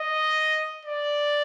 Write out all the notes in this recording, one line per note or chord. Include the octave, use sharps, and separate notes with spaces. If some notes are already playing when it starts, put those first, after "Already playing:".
Already playing: D#5
D5